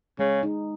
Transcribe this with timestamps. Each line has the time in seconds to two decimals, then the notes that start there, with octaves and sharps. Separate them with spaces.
0.19 C#3 G#3
0.43 D#4